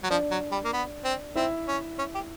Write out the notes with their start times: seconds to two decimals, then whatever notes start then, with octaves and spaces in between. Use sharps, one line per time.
0.03 F#3
0.10 F3 D4 D5
0.31 F#3
0.52 G3
0.64 A#3
0.73 B3
1.04 C4
1.36 C4 E4 E5
1.68 C#4
1.98 C#4
2.14 G4